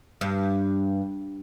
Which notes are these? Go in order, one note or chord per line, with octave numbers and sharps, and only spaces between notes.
G2